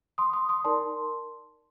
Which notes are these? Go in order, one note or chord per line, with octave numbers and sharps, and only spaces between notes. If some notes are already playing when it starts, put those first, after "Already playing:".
C6 D#6
C6 D#6
C6 D#6
D#4 A#4 D5 A5 C6